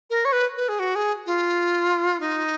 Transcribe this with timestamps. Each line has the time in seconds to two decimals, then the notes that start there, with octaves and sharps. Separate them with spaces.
0.10 A#4
0.25 C#5
0.32 B4
0.57 B4
0.69 G#4
0.79 F#4
0.95 G#4
1.26 F4
2.20 D#4